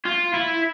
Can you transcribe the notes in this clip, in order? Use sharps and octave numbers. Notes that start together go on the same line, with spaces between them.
F4
E4